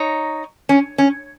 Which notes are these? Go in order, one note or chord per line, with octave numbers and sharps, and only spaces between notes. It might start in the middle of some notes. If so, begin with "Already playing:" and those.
Already playing: D#4 C#5 A#5
C#4
C#4